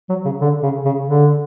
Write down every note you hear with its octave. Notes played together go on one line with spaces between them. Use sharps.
F#3
C#3
D3
C#3
C#3
D3